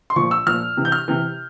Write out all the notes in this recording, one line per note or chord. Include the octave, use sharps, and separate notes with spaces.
C6
A#2 F3 C#6
E6
A#2 F3 F6
C3 E3
G6
F6
C3 E3